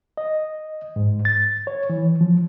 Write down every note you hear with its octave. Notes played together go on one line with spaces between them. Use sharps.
D#5
G#2
A6
C#5
E3
F3